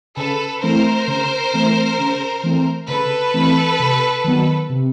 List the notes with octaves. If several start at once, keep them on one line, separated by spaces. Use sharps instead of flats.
C#3 A4 B4
E3 A3 C4 A#4 C5
C#3
E3 A3 C4
C#3
E3 A3 C4
C#3 A4 B4
E3 A3 C4
C3
D#3 F#3 B3
C3